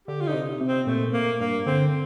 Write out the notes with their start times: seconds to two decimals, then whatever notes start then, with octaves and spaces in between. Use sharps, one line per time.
0.08 D3 G4
0.21 F4
0.27 D3 D#4
0.34 C3
0.61 C3
0.68 C4
0.87 A#2 A3
1.13 A#3
1.40 G2 A#3
1.66 D3 C4